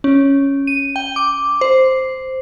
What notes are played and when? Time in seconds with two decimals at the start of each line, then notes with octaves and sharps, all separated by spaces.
0.04 C#4
0.67 D#7
0.96 G5
1.16 D6
1.61 C5